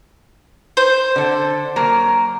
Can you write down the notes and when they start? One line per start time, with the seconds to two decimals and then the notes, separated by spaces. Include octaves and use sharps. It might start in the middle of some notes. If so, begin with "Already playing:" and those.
0.77 C5
1.16 D3 A4
1.76 F#3 A#3 A#4